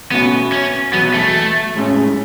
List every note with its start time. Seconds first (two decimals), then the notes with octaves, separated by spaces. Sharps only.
0.11 B2 A3 B3 C#4 F#4
0.52 C#4
0.93 E2 B2 F#3 B3
1.14 A3
1.76 A2 G#3 C#4